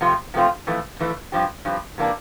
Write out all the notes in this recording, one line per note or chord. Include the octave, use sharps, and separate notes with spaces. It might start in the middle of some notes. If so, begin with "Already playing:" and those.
C3 F3 A3 C4 F4
C3 F3 A3 C4 F4
F2 E3 A3
F2 E3 A3
G2 F3 C4 G4
G2 F3 C4 G4
C3 E3 A#3 D4